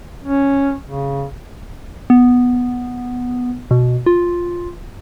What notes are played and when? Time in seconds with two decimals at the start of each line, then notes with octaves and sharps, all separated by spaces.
0.24 C#4
0.85 C#3
2.10 B3
3.71 B2
4.06 F4